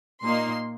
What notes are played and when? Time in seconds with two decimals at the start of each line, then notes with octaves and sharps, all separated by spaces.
0.23 A#2 A#3 D#4 C6